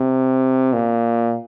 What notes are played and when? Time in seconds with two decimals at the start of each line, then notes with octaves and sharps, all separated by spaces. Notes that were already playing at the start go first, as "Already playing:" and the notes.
Already playing: C3
0.73 A#2